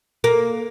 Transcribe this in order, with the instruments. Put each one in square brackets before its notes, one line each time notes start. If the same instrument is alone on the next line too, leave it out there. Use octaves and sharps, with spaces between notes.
[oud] A#3